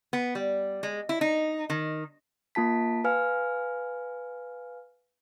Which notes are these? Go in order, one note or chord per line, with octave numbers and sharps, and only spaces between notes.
B3
G3
G#3
E4
D#4
D#3
A#3 F4 A5 B6
B4 F5 G#5 F6